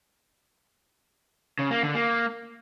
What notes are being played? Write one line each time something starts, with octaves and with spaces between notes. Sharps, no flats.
C#3
A#3
D3
A#3